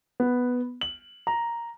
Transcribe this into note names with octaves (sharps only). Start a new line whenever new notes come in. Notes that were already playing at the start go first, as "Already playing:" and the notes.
B3
F#7
A#5